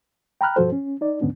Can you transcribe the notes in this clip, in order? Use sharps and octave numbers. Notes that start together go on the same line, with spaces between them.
G5 A#5 B5 F6 F#6
G2 B2 F3 F#4 A4 C5
C#4
D#4 D5
D#2 G#2 D3 B3 C#4 D4